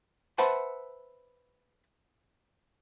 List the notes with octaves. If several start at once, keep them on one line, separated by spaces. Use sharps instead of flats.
B4 C5 E5 F#5 A5